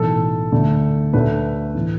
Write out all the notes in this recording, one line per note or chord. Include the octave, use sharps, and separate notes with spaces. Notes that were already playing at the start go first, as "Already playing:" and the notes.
Already playing: B1 A2 E3 A4
D2 D3 A3
D2 D3 A3 B4
A2 E3